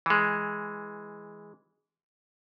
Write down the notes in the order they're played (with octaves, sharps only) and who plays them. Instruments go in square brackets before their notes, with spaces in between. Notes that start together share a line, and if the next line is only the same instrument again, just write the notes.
[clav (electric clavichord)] E3 G#3